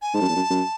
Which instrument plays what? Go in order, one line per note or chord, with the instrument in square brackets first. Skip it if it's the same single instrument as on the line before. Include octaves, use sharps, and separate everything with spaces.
[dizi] G#5
[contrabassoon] G#2 [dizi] A5
[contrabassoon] F#2
E2
F#2
F#2